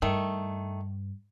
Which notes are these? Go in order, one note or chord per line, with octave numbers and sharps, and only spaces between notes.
G2 D#3 A3